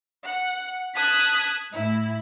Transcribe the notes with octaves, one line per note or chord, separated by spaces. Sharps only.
F#5
A5 D#6 F#6 G#6 B6
A2 E4